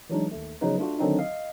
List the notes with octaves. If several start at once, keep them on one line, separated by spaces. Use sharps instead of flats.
E3 F#3 G#3 D4 D#4
D#2 A3
C#3 F3 F#3 B3 D#4 B4
A3 D4 F4 F#4
D3 D#3 F#3 C4 D4 D#4
D#5 F5